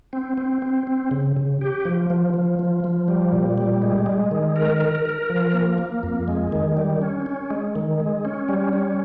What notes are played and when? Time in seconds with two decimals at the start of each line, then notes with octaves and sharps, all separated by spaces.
0.13 C4
0.37 C4
0.62 C4
0.87 C4
1.11 C#3
1.37 C#3
1.61 G4
1.85 F3
2.10 F3
2.34 F3
2.59 F3
2.84 F3
3.08 G3
3.32 A#2
3.58 G3
3.82 G#3
4.06 G#3
4.31 D#3
4.56 A#4
4.80 A#4
5.05 A#4
5.30 F3
5.54 A#3
5.78 A#3
6.03 F2
6.28 G#3
6.52 D#3
6.77 G3
7.02 C#4
7.26 C#4
7.51 G#3
7.75 D#3
8.00 G#3
8.25 C#4
8.49 G3
8.73 C#4